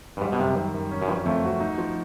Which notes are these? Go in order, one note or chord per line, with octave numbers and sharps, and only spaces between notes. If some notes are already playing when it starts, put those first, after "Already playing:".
G2
G#2 G3
B2
F#2 C3
D#3
F#2
C#4
F#2
G2 F3
F2 A3
F#4
D#4
F3